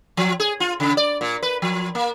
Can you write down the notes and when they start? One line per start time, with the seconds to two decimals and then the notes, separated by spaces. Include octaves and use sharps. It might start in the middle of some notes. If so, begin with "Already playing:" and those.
0.17 F3
0.40 G#4
0.60 F4
0.80 C#3
0.97 D5
1.21 A#2
1.42 B4
1.62 F3
1.95 A#3